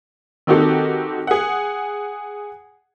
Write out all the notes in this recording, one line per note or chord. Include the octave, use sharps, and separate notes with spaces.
D#3 C4 D#4 F#4 G4 A4
G#4 F#5